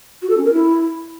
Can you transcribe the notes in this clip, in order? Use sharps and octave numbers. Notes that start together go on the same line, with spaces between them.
F#4
A4
C#4
A#4
E4